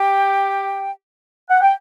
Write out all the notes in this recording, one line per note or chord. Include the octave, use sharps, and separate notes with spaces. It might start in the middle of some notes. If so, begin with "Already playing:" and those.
Already playing: G4 G5
F#5
G5